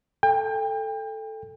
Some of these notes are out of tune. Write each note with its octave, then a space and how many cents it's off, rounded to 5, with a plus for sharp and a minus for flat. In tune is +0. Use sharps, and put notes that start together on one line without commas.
A4 +0 G5 +35